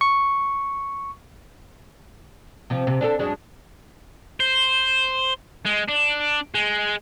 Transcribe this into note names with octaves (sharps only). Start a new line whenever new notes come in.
C#6
C3 F3
C3
D4 G#4 A4
F#2 G#3 D4
C5
G#3
D4
G#3